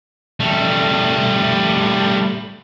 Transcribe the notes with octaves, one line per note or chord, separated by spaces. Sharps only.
G3 A3